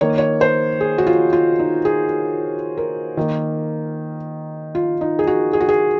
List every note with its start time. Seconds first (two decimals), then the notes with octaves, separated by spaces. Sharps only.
0.01 D#3 A#3 C#5
0.18 C#5
0.41 C5
0.80 G#4
0.98 F#4
1.07 F4
1.33 F4
1.59 D#4
1.85 G#4
2.77 A#4
3.17 D#3 A#3
4.75 F4
5.01 D#4
5.19 G#4
5.27 F#4
5.53 G#4
5.61 F#4
5.69 G#4